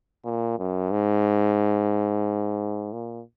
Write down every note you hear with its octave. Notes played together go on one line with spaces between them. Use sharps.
A#2
F#2
G#2
A#2